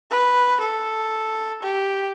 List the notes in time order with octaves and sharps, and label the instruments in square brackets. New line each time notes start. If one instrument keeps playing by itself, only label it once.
[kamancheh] B4
A4
G4